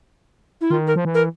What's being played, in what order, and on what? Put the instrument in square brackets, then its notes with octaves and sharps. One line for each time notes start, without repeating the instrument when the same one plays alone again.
[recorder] E4
[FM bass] D#3 [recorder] F4
[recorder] A#4
[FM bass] F3
E3
[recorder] A#4